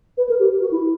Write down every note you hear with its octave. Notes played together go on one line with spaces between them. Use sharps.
B4
A#4
G4
F#4
E4